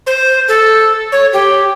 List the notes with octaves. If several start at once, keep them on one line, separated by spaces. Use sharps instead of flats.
C5
A4
C#5
G4